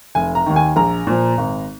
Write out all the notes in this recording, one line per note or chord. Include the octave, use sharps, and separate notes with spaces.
F1 G#5
A#5
D#2 D#3
G#5
A#1 A#5
A#2 F3
G#1